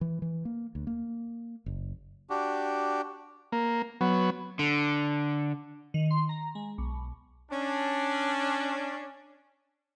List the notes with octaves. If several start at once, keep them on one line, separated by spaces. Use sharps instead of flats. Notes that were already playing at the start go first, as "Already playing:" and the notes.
E3
E3
A#3
D2
A#3
F#1
D4 F#4 G4
A#3
F#3 B3
D3
D#3
C6
A#5
G#3
B1
C#4 D4